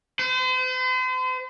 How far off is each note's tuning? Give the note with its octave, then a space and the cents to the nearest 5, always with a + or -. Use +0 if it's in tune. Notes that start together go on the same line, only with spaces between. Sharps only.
C5 -40